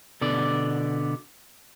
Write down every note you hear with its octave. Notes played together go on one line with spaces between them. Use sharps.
B2 D3 B3 D5